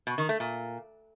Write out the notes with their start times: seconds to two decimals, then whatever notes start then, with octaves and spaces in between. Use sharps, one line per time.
0.07 B2
0.18 D#3
0.29 A3
0.40 A#2